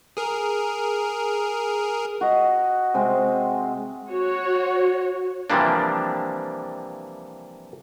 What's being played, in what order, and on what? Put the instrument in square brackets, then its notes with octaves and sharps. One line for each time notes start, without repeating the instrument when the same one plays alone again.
[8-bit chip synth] G#4 A#4
[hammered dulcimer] F#4 D#5
C3 G#3 C4
[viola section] F#4 C#5
[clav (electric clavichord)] C3 E3 F3 G3 A#3 D4